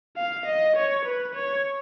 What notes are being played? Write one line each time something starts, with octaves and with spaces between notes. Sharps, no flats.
F5
D#5
C#5
B4
C#5